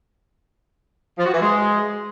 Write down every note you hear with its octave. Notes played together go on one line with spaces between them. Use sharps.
F3
F#4
E3
G#3